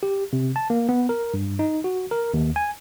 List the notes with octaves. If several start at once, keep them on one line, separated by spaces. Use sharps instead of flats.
G4
C3
A5
A#3
B3
A#4
G2
D#4
F#4
A#4
D#2
G#5